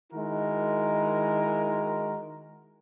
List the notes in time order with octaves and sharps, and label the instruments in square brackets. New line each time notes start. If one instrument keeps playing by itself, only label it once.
[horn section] D#3 G#3 E4 F#4 A#4